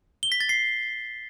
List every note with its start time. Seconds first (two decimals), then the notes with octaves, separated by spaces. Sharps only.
0.23 G7
0.32 B6
0.40 A6
0.49 C7